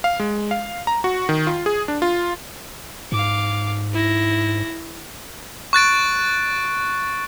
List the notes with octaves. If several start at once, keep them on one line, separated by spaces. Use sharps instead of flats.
F5
G#3
F5
A#5
F#4
D#3
F4
G#4
D4
F4
G#2 F5 D6
E4 A#6
C#6 F#6 A6 D7